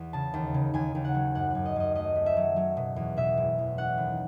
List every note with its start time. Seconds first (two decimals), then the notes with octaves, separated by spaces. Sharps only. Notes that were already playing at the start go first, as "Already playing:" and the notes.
Already playing: E2
0.13 C#3 A5
0.34 D#2
0.54 C#3
0.74 D#2 G#5
0.95 D#2
1.04 F#5
1.15 F#3
1.35 F#2 F#5
1.50 F#2 F#5
1.66 D#5
1.76 F#2 D#5
1.95 A3 D#5
2.16 A3
2.26 E5
2.37 F#3
2.56 F#3
2.77 B2
2.96 E2
3.17 B2 E5
3.38 F#1
3.58 E2
3.78 C#4 F#5
3.98 D#2